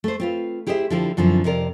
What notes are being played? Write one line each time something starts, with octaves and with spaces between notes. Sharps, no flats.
A3 C5
C4 F4 B4
E4 G4 G#4 C5 D5 E5
D3 F3 E4 G4 C5
F#2 D3 F3 C4 E4
F2 C3 A#4 D5